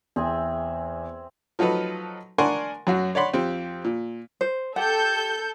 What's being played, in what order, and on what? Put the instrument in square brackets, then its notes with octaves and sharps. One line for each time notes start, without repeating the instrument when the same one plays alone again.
[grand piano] E2 [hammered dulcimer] C4 G#4 E5
[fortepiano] F3 F#3 D#4 A4 B4
D4 A#4 F#5 G#5 C6 C#6
F#2 F#3 F#4
C#5 D5 F#5 B5 C6
F2 C4 G4
A#2
[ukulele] C5
[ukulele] G4 F#5 [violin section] A4 G6